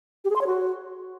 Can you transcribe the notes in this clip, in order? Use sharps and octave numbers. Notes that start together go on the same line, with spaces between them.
G4
G#4
C6
C#5
F#4